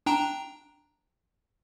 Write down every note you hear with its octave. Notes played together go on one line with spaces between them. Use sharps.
D4 G5 A#5